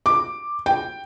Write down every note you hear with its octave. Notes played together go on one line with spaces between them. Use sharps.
D6
G5